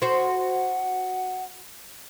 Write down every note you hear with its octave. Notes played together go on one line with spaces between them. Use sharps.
F#4 C5 F#5